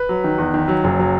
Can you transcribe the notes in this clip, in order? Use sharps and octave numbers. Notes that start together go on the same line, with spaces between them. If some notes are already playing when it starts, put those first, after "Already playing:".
Already playing: B4
F#3
D#3
E2
D#3
F#3
F#1
F#3